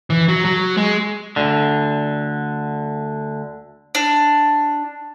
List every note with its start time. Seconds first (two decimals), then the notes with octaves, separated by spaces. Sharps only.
0.10 E3
0.28 F#3
0.45 F#3
0.77 G#3
1.36 D2 D3
3.95 D4